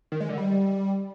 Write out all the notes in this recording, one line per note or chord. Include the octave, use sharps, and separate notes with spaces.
D#3
G#3
D3
G3